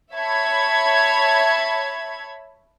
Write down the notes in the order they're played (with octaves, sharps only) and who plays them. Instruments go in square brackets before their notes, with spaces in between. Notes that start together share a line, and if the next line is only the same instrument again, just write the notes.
[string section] C#5 E5 A5 B5 G#6